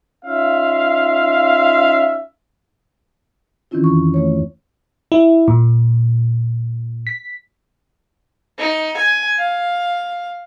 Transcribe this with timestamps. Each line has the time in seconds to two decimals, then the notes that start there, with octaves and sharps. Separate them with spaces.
0.25 C#4 D#4 F4 E5 F5
3.71 D#3 E3 C4 C#4 E4 F4
3.84 F2 C#6
4.14 A3 C#5
5.12 E4
5.48 A#2
7.07 B6
8.59 D#4
8.97 G#5
9.39 F5